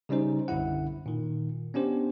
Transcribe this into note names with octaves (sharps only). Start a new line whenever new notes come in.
C#3 G3 C#4 D#4 C5
B1 F#2 D3 E4 F#5
A#2 D#3
B3 C#4 D4 G4 C5